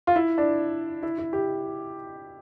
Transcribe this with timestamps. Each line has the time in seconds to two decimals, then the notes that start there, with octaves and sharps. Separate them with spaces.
0.07 F4
0.16 E4
0.38 D4
1.03 E4
1.18 E4
1.33 G4